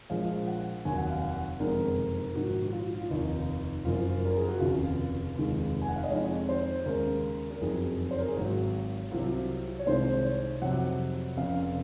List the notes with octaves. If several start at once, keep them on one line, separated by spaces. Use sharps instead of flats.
A#1 A#2 F3 G#3 F5
F#5
F1 D#2 D#3 F#3 G#5
F#5
F5
F#5
F#1 F2 C3 D#3 G#3 A#4
A#1 G#2 D#3 F#4
F#4
F4
F4
F1 D#2 D#3 D#4
F#1 F#2 F3 F4
A#4
G#4
F#4
F1 D#2 C#3 F4
F1 D#2 D#3 G#3
G#5
F#5
F5
D#5
F2 D#3 G#3 C#5
C5
D#2 C#3 G#3 A#4
A#4
F#1 F2 D#3 F#3 G#4
C5
A#4
G#4
G#1 G#2 F#3 F#4
C2 C3 F#3 F4
C#5
C2 C3 D#3 G#3 C5
C#5
F2 C3 F#3 F#5
F1 F2 C#3 F5